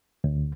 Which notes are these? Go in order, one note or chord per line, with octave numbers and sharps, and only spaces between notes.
D2